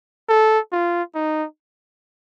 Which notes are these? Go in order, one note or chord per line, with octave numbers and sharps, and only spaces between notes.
A4
F4
D#4